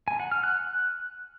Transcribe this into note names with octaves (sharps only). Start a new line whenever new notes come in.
G#5
F#5
F6
F#6